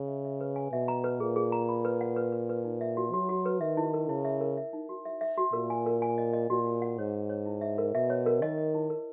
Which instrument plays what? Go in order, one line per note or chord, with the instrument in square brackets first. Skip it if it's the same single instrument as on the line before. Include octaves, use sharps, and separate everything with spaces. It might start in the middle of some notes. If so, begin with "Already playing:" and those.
Already playing: [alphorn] C#3
[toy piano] E5
E5
B4
G#5
[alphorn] B2 [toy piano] E5
[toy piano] A#5
B4
[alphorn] A#2 [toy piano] G#4
[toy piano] G#4
A#5
B5
B4
F#5
B4
B4
B4
D#4
E5
F#4
[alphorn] F#3 [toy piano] F#4
[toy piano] F#4
B4
[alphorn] D#3 [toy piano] E5
[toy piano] E4
A#4
[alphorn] C#3 [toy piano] E4
[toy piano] E5
A#4
E5
D#4
F#4
E5
E5
F#4
[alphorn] A#2 [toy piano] A#4
[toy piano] G#5
A#4
G#5
D#5
D#5
[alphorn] A#2 [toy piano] F#4
[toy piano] F#4
F#5
[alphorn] G#2 [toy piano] C#5
[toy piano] F#5
C#5
E4
E5
A#4
[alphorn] B2 [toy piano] E5
[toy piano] C#5
A#4
[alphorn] D#3 [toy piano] D#5
[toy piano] D#5
E4
A#4